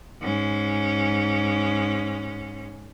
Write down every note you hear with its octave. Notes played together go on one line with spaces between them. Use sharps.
G#2 C#4